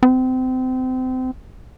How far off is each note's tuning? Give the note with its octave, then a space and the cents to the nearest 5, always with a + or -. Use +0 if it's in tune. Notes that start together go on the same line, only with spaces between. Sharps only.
C4 -30